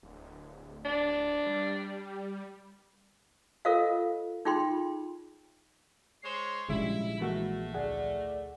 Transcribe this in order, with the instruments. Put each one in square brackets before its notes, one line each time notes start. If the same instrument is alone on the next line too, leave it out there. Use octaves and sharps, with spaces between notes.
[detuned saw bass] D1
[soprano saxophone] D4
[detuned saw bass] G3
[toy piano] F4 A4 A#4 C5 D#5 F5
D#4 F4 G#4 G5 B5 C6
[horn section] G#3 C5 C#5 [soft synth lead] C7
[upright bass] A#1 [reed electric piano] C#3 G3 [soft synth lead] G#3 [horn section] E4
[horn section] A2 A3 [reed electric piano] E3 A#3 F#4
[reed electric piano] D2 G#4 F#5 [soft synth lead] D5